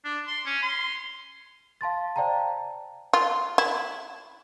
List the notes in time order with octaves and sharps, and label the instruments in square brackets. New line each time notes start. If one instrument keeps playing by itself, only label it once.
[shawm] D4
C6
C#4
C6
[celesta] F5 A5 C6 A6
C5 D5 F5 G5 A5 A#5
[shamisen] F4
E4